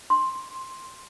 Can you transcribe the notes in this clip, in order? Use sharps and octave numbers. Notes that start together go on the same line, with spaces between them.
C6